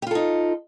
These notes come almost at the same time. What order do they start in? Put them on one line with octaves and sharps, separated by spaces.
G4 F4 A4 D#4